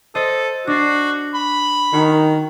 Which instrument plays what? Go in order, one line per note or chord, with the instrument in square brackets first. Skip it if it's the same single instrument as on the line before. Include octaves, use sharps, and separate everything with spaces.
[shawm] A4 [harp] C5 D#5
[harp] D4 C7 [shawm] F#4
[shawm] B5
[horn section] D#3 [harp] F#4